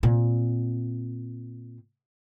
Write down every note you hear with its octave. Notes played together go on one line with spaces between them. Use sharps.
A#2 C4